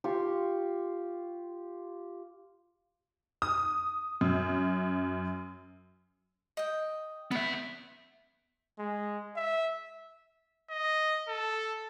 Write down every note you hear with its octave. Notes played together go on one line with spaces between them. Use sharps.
F4 G4 C6 C#6
D#6
F#2
D#5 G5
B3 B4 E5
G#3
E5
D#5
A4